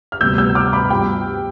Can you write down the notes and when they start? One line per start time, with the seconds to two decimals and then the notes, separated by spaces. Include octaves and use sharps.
0.12 F6
0.21 D2 C3 G3 B3 E6 G6
0.38 E6 G6
0.55 D6 F6
0.73 B5 D6
0.90 G2 F3 B3 G5 B5